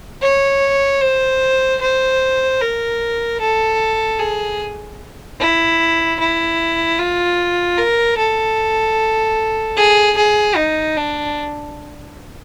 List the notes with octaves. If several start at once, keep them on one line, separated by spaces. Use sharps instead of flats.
C#5
C5
C5
A#4
A4
G#4
E4
E4
F4
A#4
A4
G#4
G#4
D#4
D4